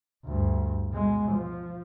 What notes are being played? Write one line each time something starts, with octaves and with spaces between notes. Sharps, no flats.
D2 G2
B2 G#3
F3